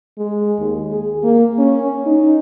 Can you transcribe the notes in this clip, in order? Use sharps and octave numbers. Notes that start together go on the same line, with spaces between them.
G#3
D#2
G#4
A#3
C#4
D#4